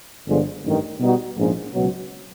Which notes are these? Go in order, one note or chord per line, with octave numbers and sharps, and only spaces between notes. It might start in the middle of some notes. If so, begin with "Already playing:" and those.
G1 G2 D3 F3 G#3
A1 G2 D#3
B2 G3 B3 D#4 F#4
A#1 G#2 F3 G#3 C#4
C#2 B2 F#3